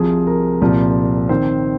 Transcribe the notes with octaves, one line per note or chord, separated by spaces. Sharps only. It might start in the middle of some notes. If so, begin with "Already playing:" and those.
Already playing: C2 C3 F3 G#4
A#4
C2 A#2 F3
D#3 C4 C5